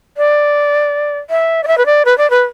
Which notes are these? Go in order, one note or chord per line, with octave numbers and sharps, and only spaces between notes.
D5
E5
D5
E5
B4
D5
B4
D5
B4